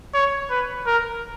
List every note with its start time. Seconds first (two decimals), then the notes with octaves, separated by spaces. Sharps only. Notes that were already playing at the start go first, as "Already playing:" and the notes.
0.14 C#5
0.50 B4
0.86 A#4